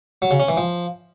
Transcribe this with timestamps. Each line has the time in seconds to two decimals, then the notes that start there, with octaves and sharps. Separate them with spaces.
0.22 F#3
0.31 C#3
0.40 C#4
0.48 E3
0.57 F3